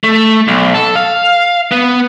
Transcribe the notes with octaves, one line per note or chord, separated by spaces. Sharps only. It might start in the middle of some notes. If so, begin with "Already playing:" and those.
A3
B1
A4
F5
B3